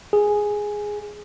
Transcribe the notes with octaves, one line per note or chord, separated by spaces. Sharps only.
G#4